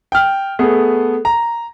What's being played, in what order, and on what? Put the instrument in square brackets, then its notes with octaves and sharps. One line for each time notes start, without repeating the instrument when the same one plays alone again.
[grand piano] G5 F6
A3 B3 G#4
A#5